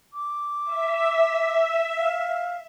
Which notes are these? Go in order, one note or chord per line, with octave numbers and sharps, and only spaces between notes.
D6
E5
F5